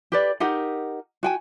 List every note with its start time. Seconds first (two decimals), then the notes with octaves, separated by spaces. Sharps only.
0.12 G4 B4 D5
0.40 D#4 G4 A#4 F#5
1.23 F#4 G5 G#5